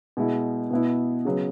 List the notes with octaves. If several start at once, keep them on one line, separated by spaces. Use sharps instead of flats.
B2 G#3 E4
B2 B3 E4
C#3 F#3 B3